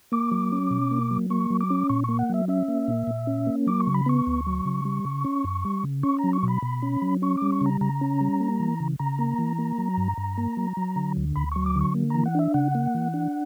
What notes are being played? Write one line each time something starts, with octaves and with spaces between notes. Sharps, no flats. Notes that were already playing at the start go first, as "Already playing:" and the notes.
A#3 D6
F#3
C#4
B2
A#3
F#3
A#3 C#6
F#3
D6
C#4
A#2 C#6
A#3 C#6
F#5
F#3 E5
C#4 E5
A#3
A#2
A#2
C#4
A#3
F#3 D6
C#6
C#3
B5
B3 C#6
D2
F#3
C#3
G3
C#3
C#4
F#2
G3
C#3
C#4 C#6
A#5
F#3
C#6
B2 B5
B2
C#4
F#3
C#4 C#6
G3 D6
C#6
C#3 A#5
C#3 A#5
C#4
G3
A#3
E3
C#3
C#3 A#5
A#3
E3
A#3
F#3
G2
G2
A#3
F#3
F#3
D3
D2
D2 B5
F#3 C#6
D6
D3 C#6
A#3
E3 A#5
F#5
D4 E5
C#3 F#5
A#3
E3
D4